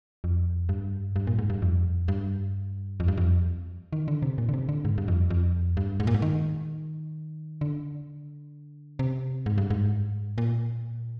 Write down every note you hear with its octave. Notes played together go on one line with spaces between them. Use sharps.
F2
G2
G2
A#2
G#2
G2
F2
G2
F2
G2
F2
D#3
D3
C3
A#2
D3
C3
D3
G#2
G2
F2
F2
G2
G#2
A#2
G#2
D#3
D3
C3
G#2
G2
G#2
A#2